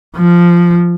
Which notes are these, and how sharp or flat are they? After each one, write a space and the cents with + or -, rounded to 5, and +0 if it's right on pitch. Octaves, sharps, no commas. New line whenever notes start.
F3 -10